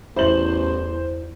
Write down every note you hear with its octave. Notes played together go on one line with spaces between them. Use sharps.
A1 E2 E4 C5 F#7